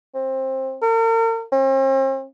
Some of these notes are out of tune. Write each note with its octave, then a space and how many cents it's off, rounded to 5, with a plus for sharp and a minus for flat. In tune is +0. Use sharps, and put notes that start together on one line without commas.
C4 +20
A#4 -40
C4 +45